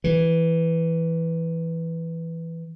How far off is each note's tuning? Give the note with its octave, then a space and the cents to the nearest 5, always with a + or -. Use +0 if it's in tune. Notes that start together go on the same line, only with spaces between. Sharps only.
E3 +0